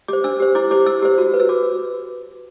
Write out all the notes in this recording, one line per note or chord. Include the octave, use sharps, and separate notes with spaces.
G4 C5 D6
D4 E6
G4 C5
E4 D6
G4 C5 D6
E4 E6
G4 C5
F#4
B4
E6
F#4 D6